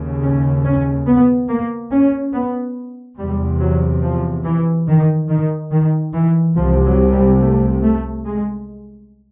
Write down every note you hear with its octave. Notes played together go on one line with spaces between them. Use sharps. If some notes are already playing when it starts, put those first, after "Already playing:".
Already playing: D#2 C#3
C#4
C#4
B3
A#3
C#4
B3
E2 C3 G3
F#3
F3
E3
D#3
D#3
D#3
E3
C2 C3 F3
F#3
G3
A3
A3
G#3